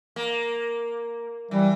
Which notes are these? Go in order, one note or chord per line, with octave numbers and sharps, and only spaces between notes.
A#3
E3 G3